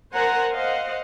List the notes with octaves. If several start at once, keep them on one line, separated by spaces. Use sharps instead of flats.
A#4 C5 F#5 G#5 A#5
C5 D#5 F5 F#5